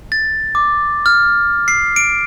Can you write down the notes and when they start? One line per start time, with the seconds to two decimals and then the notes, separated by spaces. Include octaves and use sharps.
0.12 A6
0.55 D6
1.06 F6
1.68 C7
1.96 D7